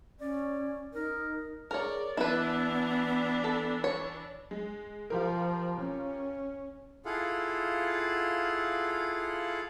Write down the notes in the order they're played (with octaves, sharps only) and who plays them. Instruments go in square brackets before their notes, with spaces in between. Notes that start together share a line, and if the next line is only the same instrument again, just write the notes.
[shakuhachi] C#4 [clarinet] D5
[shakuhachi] D#4 [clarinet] A#4
[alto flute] G#4 [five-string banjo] A#4 C#5 [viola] D5
[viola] E3 D4 [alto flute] B3 [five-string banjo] E4 B4
[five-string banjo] A4
C#5
[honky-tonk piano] G#3
[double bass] F3 [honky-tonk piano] F4 G4 A#4
[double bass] C#4
[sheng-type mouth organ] E4 F4 G#4 A4 F5 F#5